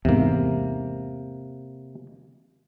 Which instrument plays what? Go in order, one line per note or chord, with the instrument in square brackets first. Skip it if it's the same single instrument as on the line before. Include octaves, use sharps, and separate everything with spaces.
[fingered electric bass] E2 G#2 [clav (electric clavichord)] C3 A#3